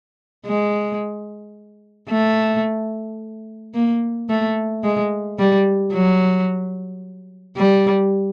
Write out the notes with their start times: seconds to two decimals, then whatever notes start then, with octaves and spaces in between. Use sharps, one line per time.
0.46 G#3
2.09 A3
3.74 A#3
4.29 A3
4.83 G#3
5.39 G3
5.93 F#3
7.57 G3